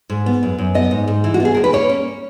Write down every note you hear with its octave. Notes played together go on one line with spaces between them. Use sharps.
G#2
B3
F#2
F#2
B3 D#5
G#2
G#2
E3
F#4
B3
G#4
D#2 A#4
B4
A#3 C#5
C#4